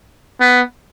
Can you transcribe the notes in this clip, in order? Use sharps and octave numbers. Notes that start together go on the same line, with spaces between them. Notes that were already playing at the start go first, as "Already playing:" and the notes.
B3